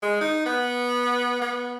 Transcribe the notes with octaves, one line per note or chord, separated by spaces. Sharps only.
G#3
D#4
B3
B3